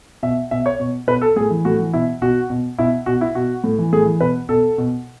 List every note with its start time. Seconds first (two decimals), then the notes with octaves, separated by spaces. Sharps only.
0.23 B2 E5
0.51 B2 E5
0.66 C#5
0.80 B2
1.07 B2 B4
1.22 A4
1.36 A2 G#4
1.51 E3
1.65 A2 F#4
1.79 E3
1.93 B2 E4
2.22 B2 F#4
2.50 B2
2.79 B2 E4
3.06 B2 F#4
3.21 E4
3.35 B2 F#4
3.64 A2
3.78 E3
3.93 A2 G#4
4.06 E3
4.20 B2 B4
4.49 B2 A4
4.78 B2